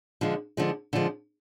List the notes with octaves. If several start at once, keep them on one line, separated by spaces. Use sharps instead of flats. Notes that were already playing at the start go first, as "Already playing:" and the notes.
D3 F3 G#3
D3 F3 G#3
D3 F3 G#3